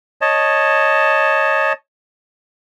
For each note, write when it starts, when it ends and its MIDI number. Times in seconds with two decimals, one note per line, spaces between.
0.21 1.73 73
0.21 1.73 75
0.21 1.73 81